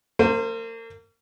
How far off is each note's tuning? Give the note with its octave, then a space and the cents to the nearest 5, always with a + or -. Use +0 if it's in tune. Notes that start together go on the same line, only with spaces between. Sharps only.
A#3 -40 C5 +5